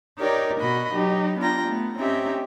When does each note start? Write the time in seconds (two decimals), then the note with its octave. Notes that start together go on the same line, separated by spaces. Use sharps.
0.18 D#4 G4 A#4 C#5 D5
0.60 B2 F#4 D#5 B5
0.93 F#3 D#4 G4
1.39 B3 D4 F4 G5 A#5
1.67 A3 B3
1.98 C4 C#4 D#4 G4 E5 G5